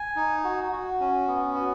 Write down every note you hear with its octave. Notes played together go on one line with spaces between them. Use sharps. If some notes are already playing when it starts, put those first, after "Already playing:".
Already playing: G#5
D#4
F#4
F#4
C#4
B3
F#4